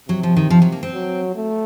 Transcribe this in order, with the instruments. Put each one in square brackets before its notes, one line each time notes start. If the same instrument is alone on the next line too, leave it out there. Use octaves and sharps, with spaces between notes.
[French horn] C3 [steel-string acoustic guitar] F#3
[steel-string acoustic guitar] F3
D#3
F3
F#3
A#3
C4
[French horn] F#3
A3